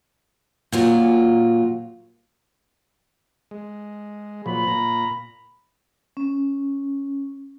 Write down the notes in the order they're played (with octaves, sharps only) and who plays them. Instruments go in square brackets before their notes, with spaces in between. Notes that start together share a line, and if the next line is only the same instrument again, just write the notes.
[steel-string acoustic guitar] A#2 F#3 F4
[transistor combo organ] G#3
[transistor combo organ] A#2 F3 F#3 [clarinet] B5
[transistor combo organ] A#2 A#5
[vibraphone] C#4